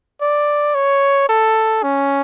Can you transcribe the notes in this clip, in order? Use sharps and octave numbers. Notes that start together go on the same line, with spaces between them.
D5
C#5
A4
C#4